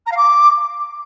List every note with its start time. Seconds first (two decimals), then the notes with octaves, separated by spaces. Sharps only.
0.06 A#5
0.11 F5
0.16 D6